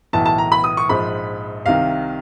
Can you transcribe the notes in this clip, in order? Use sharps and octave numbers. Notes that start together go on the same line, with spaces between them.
B1 A2 E3 A5
A5
A#5
B5
D#6
C#6
A#1 G#2 F3 B5
C2 C3 D#3 F5